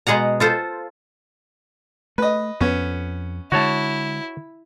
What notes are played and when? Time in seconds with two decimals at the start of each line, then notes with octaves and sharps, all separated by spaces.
0.07 B2 G#3 G#4 F#5 A#5
0.40 F4 A4 C5
2.18 A3 B4 D#5
2.60 F2 B3 C#4
3.52 D3 G#3 E4 F#4 C#5 A5